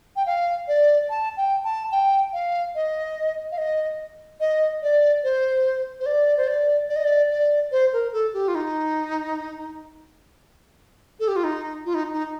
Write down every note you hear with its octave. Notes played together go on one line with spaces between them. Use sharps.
G5
F5
D5
A5
G5
A5
G5
F5
D#5
F5
D#5
D#5
D5
C5
C5
D5
C5
D5
D5
D#5
D5
D5
C5
A#4
A4
G4
F4
D#4
A4
G4
F4
D#4
F4
D#4
D#4